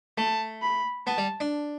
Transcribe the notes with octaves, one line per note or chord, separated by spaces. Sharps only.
A3 A5
B5
B3 A5
G3
D4